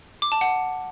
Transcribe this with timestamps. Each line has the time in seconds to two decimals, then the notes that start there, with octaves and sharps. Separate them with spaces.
0.22 D6
0.32 A5
0.41 F#5